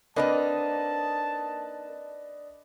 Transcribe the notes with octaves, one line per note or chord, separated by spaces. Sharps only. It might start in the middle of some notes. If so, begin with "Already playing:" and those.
A#3 C4 D4 D#4 B4 D#5 A5